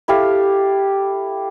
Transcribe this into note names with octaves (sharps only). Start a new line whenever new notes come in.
E4 G4 A4 F5